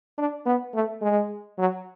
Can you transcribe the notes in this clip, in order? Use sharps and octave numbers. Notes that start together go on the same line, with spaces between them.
D4
B3
A3
G#3
F#3